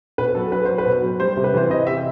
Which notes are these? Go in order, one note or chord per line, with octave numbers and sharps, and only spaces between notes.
B2 B4
F#3 A4
F#3 B4
F#3 C5
B4
B2
F#3
G3 C5
C3
B4
E3 C5
C3 D#5
C3 E5